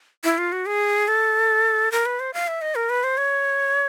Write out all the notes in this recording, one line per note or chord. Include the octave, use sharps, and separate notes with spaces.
E4
F4
F#4
G#4
A4
A#4
B4
C5
F5
E5
D#5
A#4
B4
C5
C#5